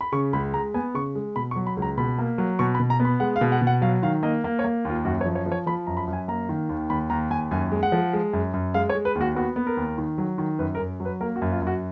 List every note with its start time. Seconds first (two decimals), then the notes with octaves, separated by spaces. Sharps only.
0.01 B5
0.12 C#3 C#6
0.33 C#2 B5
0.54 G#3 A#5
0.74 B3 G#5
0.94 C#3 C#6
1.15 G#3
1.36 B2 B5
1.51 C#6
1.56 F#3
1.67 B5
1.77 C#2
1.82 A#5
1.97 B2 B5
2.18 A#3
2.38 F#3
2.59 B2 C#6
2.75 B5
2.80 B2
2.90 A#5
3.00 B3
3.05 B5
3.20 G#3 F#5
3.36 F5
3.41 B2
3.52 F#5
3.61 B2
3.67 F#5
3.82 F#3 F5
4.03 D#3 F5
4.23 A#3 D#5
4.44 A#3
4.59 C#5
4.64 A#3
4.85 D#2
4.90 F4
5.05 F#2 F#4
5.21 C#5
5.26 F3
5.35 C#5
5.46 F3
5.52 C#5
5.67 F3 B5
5.87 F#2 A#5
5.97 B5
6.08 F#2
6.13 G#5
6.28 A#3 A#5
6.49 D#3
6.69 D#2
6.90 D#2 B5
7.10 D#2 A#5
7.30 D#2 G#5
7.51 F#2 G#5
7.72 G#3
7.83 F#5
7.92 F3
8.13 G#3
8.33 F#2
8.54 F#2
8.74 G#3 F5
8.89 C#5
8.95 G#3
9.05 B4
9.15 D#2
9.21 F#4
9.35 B3 F#4
9.56 B3
9.67 A#4
9.77 D#2
9.98 D#3
10.18 F#3
10.38 D#3
10.59 F#2 B4
10.75 A#4
10.79 F#2
11.00 F#3
11.05 B4
11.21 A#3 A#4
11.36 F#4
11.42 F#2
11.52 F4
11.62 F#2
11.67 F#4